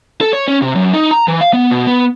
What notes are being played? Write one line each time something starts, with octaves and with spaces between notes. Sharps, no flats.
A4
C#5
C#4
C3
F#2
D#4
A#5
E3
F5
B3
B2
B3